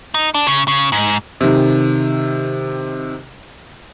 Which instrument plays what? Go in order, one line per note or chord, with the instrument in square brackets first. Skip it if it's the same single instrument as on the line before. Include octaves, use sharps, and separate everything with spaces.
[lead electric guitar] D#4
D4
C#3
C#3
G#2
[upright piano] C3 D#3